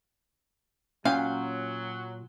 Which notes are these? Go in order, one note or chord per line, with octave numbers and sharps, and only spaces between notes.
A#2 F#3 C#4 F5 G5